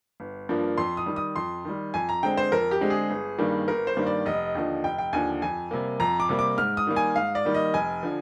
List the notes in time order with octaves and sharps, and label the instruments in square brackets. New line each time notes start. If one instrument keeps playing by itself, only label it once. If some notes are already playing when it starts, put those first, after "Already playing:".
[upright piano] G1
G2 F3 A#3 D4
F2 C6
D#6
D#3 G3
D#6
F2 C6
D#3 G3
F2 G#5
A#5
D3 G#3 C4 G5
C5
F2 A#4
G4
D3 G#3 C4
G#4
G1
G2 D#3 G3 A#3
G1 A#4
C5
G2 D#3 G3 A#3
D5
F1 D#5
D#2 D3 F3
F1 G5
G5
D#2 D3 F3 G#5
F2 G#5
C3 G3 A#3
F2 A#5
D6
C3 G3 A#3
D6
G#2 F6
D#6
D#3 G3 A#3
G#5
G#2 F5
D5
D#3 G3 A#3
D#5
F1 G#5
D3 F3